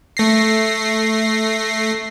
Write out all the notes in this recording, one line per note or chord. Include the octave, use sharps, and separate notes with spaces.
A3 A#6 C7